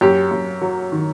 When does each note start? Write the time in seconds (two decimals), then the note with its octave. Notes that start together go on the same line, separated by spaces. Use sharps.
0.01 F#2 G4
0.31 F#2
0.61 F#3
0.92 D#3